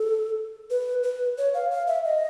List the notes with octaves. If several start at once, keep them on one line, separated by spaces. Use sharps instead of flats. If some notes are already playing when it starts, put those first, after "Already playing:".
Already playing: A4
B4
B4
C#5
F5
F5
E5
D#5